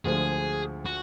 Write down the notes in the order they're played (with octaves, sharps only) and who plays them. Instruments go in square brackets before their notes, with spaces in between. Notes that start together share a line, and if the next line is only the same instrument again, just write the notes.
[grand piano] D2 D3 F3 G#3 [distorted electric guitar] G#4
[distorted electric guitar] F#4